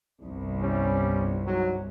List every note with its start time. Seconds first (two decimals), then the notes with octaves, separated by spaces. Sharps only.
0.21 G1 C2
0.60 G3 C#4
1.46 G#2 F#3